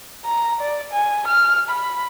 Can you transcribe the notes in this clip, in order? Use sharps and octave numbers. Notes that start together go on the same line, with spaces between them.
A#5
D5
G#5
F6
B5